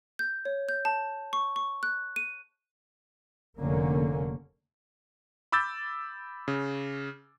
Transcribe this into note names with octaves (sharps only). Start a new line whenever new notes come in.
G6
C#5
G6
A5
C#6
C#6
F#6
D#7
F1 D3 A#3 C#4
B5 D6 E6 G6 A6
C#3